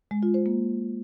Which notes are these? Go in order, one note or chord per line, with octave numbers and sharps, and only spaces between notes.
G#3
F4
C5
A#3